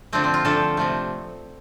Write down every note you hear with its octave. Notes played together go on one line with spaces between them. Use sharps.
D3 F3 A3 C4
C4
F4
D3 F3 A3 A4
C3 F3 A3